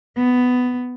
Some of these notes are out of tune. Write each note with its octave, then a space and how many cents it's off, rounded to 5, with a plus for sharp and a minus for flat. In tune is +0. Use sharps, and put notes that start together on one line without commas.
B3 +10